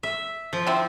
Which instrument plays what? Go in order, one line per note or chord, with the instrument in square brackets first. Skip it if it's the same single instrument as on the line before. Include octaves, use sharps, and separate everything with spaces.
[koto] E5
F3
[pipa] D3 C4 E4